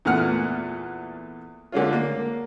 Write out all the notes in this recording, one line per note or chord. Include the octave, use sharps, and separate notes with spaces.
E2 A#2 A3 F#5 F6
D3 G#3 C#4 F4
A#3